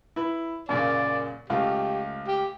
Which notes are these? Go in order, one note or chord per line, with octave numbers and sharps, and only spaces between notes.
E4 B4
F#2 A#2 C#3 D5
C#2 A3 F4 G4
G4